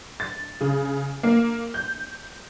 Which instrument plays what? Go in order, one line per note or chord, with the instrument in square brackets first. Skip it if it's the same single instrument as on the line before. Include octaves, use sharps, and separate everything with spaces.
[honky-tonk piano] A6
C#3
A#3
G6